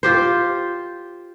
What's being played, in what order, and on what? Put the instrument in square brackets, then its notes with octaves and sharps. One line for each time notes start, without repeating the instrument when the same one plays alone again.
[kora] F4 G4 C5